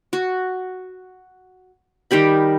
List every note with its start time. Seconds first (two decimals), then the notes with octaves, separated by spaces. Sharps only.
0.13 F#4
2.11 D#3 G3 G4 B5